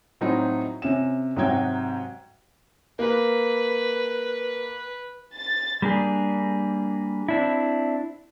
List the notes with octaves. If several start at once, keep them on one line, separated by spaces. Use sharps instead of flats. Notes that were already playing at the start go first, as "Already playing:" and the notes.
A2 F#3 C4 D#4
C3 C#4 E7
G#2 C3 F#3 G5 G#6
A#3 B4
A6
G3 A#3 D4 G#4
C4 D4 E4